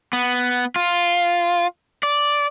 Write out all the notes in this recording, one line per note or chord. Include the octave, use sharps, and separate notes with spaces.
B3
F4
D5